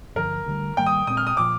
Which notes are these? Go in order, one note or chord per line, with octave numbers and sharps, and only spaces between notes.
G2 D3 F3 A#4
D2 D3 G3
G#2 D#3 G3 A#3 G5
D#6
A#2 G#3 C4 D#6
F6
D#6
A#2 F3 D6